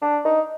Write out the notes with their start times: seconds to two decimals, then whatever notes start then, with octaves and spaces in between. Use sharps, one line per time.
0.02 D4
0.25 D#4